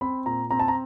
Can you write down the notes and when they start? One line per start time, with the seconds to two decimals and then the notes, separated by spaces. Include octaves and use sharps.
0.01 C4 B5
0.26 A#2 A#5
0.51 C4 A#5
0.59 A5
0.68 A#5